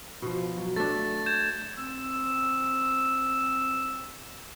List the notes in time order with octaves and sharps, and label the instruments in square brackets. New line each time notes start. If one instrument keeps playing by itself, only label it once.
[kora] B2 F3
F#3
[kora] A3 D4 [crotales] A6
[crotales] G6 G#6 E7
[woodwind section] C4 E6